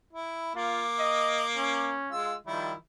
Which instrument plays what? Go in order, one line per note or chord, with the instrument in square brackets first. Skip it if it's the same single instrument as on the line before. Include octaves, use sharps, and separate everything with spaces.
[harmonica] E4
[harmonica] A#3 D6 [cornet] F4
[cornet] D#5
C#4
[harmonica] G#3 F4 E6
[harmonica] D#3 F3 E4 [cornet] G3